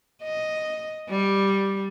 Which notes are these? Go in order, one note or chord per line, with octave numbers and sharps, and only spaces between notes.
D#5
G3